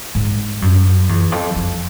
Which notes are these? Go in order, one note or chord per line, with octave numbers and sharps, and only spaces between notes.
G#2
F#2
E2
F2
F2